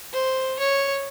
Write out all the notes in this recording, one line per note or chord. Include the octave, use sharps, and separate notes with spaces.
C5
C#5